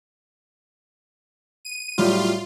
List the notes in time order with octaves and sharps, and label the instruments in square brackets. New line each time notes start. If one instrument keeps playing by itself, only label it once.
[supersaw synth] D#7
[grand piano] A2 F#3 G3 [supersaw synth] F4